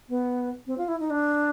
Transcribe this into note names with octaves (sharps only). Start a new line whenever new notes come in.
B3
C4
F4
E4
D#4
D4